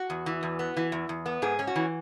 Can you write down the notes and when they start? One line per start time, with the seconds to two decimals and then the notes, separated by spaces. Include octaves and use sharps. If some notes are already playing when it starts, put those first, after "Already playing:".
Already playing: F#4
0.10 E2
0.26 E3
0.43 E2
0.59 B3
0.77 E3
0.92 E2
1.09 E2
1.26 B3
1.42 G#2 G#4
1.59 C#4
1.67 F#4
1.76 E3